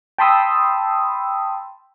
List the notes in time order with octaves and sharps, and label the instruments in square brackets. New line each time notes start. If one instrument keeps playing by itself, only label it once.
[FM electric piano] G5 A5 B5 C6 D#6 E6